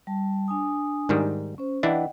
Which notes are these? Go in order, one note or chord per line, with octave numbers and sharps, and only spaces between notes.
G3 A5
D4 G#5 D#6
G#2 D#3 G3
C#4 C5
E3 D4 E4 D#5 F#5 G5